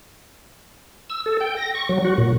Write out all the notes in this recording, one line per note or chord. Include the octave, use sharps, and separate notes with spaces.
E6
A4
G5
A#6
C#6
F#3
F#4
A#2